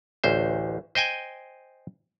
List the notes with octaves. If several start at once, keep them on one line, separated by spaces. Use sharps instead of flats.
A1 D2 C5
C5 D#5 G5 G#5